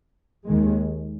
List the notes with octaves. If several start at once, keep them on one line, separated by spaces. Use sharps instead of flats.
D#2 D#3 G#3